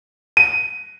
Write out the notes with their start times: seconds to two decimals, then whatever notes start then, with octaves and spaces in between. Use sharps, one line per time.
0.37 D#7